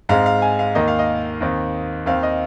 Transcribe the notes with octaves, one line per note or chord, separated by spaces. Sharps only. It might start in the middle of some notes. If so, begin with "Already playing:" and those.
G#2 G#3 C4 F5
F5
G#5
F5
D#2 D#3 A#3 D#5
F5
D#5
D#2 D#3 C4
D#2 D#3 C4 F5
D#5